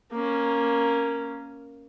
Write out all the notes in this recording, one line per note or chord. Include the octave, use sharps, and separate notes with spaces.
A#3 C#4